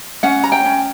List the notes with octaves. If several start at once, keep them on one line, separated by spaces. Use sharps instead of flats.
C#4 F#5
A#5
G5
C#4